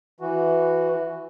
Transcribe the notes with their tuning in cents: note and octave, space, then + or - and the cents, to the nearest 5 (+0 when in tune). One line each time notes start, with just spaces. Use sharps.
E3 +10 F#4 +0